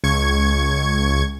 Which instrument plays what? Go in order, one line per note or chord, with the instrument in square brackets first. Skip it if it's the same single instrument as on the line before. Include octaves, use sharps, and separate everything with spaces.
[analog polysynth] C#2 C#6 G#6